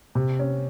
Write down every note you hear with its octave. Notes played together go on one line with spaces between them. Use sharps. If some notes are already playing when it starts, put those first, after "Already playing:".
C3
C#4